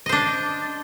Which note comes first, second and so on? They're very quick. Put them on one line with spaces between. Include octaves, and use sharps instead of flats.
D#5 C5 D4